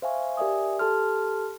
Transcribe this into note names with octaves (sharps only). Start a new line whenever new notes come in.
C5 E5 F5 G#5 C#6
G4 A#4 D5 E5 G#5 D#6
G4 A4 A5 C6 F6